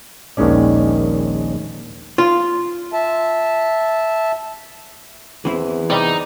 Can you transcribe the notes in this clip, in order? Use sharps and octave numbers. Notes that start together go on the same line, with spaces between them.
A#1 D#2 D#3 G#3 C#4 D5
F4
E5 A5
E2 E3 C4 E4
C3 G3 D#4 D5